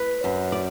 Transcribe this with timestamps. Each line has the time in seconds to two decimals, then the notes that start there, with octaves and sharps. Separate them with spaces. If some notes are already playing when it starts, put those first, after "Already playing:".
Already playing: B4
0.24 F#2
0.52 D5